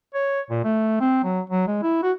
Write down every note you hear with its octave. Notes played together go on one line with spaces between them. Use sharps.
C#5
A#2
A3
C4
F#3
F#3
G#3
E4
F#4